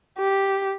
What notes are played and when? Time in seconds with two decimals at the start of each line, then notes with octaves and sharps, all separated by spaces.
0.17 G4